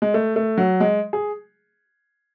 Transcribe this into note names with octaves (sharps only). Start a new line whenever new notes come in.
G#3
A3
A3
F#3
G#3
G#4